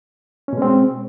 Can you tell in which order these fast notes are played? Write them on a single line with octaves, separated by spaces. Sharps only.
C#4 B2 G#3 C4